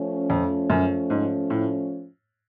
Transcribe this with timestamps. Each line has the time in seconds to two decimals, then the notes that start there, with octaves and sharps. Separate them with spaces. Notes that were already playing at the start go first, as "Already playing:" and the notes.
Already playing: F3 A3 C#4
0.30 F2
0.70 F#2
1.10 G#2
1.50 A2